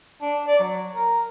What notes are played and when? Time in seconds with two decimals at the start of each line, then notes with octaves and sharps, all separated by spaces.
0.22 D4
0.47 D5
0.60 F#3
0.95 A#4